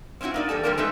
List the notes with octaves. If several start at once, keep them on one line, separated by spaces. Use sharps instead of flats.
C4 C#4 D#4 E4 F#4
A#3 D#4 D5
E3 G3 A4 A5
D3 F3 G3 A#3 D4 A#4
C3 G#3 D#4 A4 B4 E5